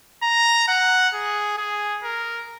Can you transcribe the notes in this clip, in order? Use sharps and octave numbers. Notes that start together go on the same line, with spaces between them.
A#5
F#5
G#4
G#4
A#4